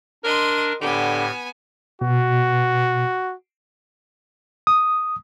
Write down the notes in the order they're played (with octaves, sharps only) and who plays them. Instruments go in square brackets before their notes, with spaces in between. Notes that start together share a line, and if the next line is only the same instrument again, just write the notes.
[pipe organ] D4 [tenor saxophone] A#4 [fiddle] D#5 C6
[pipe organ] A2 [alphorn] D3 [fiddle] B3 G#5 [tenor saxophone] G4
[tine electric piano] B2 [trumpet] F#4
[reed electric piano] D#6